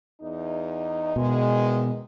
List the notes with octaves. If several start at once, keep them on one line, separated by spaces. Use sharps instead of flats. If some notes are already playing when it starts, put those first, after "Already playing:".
E2 D#4
E2 B2 D#3 G#3